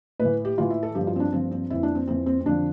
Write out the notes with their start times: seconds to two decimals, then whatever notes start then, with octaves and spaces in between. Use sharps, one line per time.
0.20 A2 B4
0.25 E3
0.45 G4
0.58 A2 E3 F4
0.70 E4
0.83 A4
0.95 G2 F3 G4
1.07 F4
1.16 C4
1.20 D4
1.32 G2 F3 C4
1.51 C4
1.70 F2 E3 E4
1.83 D4
1.95 C4
2.08 F2 E3 C4
2.26 C4
2.41 C4
2.45 F2 D3 F3 D4